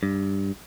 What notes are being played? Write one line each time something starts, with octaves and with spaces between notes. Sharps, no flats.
G2